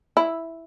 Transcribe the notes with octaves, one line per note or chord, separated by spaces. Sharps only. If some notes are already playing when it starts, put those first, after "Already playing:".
E4